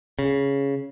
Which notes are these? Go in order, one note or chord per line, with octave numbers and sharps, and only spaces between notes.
C#3